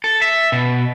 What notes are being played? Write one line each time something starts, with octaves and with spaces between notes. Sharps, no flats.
A4
E5
B2